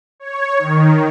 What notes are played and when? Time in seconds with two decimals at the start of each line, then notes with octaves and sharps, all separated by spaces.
0.20 C#5
0.58 D#3